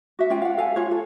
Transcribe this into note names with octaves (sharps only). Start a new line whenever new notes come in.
F#4 E5
C#4 F4 G5
F5 F#5
A4 F5 G#5
F4 C#5
A4